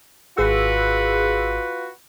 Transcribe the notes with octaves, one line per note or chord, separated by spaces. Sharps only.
G#1 F4 F#4 G#4 B4 E6